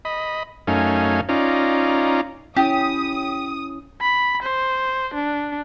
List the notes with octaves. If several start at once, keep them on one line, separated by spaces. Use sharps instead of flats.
D#5 B5
F#2 A3 C#4 D#4 F5 G#5
C#4 D#4 F4 D5 A#5
C#4 E4 G4 D#6
B5
C5
D4